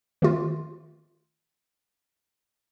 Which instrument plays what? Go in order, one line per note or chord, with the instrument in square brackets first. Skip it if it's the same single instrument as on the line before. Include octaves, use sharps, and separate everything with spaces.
[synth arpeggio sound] D#3 A3 F4